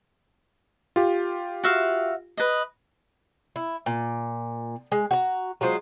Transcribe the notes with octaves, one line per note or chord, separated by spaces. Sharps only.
F4 G4
F#4 E5 F5
B4 D#5
E4
A#2
G#3
F#4 A#5
F#3 G#3 F4 C5